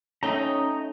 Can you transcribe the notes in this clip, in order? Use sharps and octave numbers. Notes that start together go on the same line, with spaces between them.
A3 C#4 D#4 C#5 D#5 G5 A#5